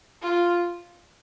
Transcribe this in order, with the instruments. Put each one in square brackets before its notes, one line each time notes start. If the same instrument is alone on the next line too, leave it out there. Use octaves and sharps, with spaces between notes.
[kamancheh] F4